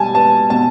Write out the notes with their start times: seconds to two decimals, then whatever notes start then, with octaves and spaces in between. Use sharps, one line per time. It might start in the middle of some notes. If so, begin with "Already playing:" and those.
Already playing: B2 G3 G#5 A5
0.15 B3 A5
0.50 B2 A5